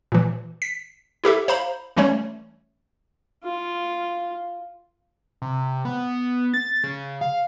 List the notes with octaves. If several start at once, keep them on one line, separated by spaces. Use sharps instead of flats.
A#2 E3
B6
E4 G4 A4 E5
C5 F5 A#5 B5
E3 G3 A3 C#4 C#5
F4
C3
B3
A6
C#3
F5